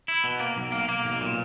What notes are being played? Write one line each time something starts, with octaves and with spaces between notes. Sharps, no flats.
E4
B2
A#3
B1
A#3
A#3
B1
A#2